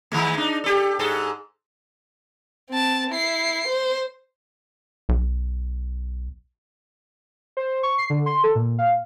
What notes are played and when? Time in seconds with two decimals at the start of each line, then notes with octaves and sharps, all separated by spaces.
0.12 D#3 G#3 A3
0.37 D4 D#4
0.64 G4 A4
0.99 G#2 G#4 A4
2.70 C4 A5
3.10 E4 C7
3.68 C5
5.09 B1
7.57 C5
7.83 C#6
7.98 C7
8.10 D3
8.26 C6
8.43 A4
8.55 A#2
8.78 F5